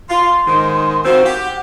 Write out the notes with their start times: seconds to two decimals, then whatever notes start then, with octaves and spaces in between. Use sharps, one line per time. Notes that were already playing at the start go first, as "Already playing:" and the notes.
0.10 F4 C6
0.47 G#2 D#3
1.05 D#3 F3 C4 F#4
1.25 G4 F#5